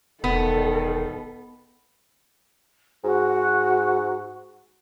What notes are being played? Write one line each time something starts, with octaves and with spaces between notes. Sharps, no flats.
E1 D#3 B3 A4
G#2 F#4